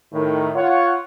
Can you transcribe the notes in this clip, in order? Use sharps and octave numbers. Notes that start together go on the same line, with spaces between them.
A2 D#3
F4 C#5 F#5